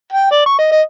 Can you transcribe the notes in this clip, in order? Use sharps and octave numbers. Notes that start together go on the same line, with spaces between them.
G5
D5
C#6
D#5
D#5